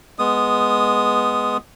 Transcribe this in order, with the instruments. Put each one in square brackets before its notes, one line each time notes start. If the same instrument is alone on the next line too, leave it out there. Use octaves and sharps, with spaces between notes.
[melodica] G#3 B3 D#6